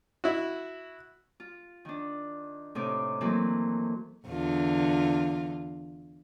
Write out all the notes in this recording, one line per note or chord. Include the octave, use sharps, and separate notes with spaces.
E4 F#4
F4
D#3 D4
A2 C3 D#4 D6
D#3 E3 F#3 A3 A#3 C4
E2 D3 F4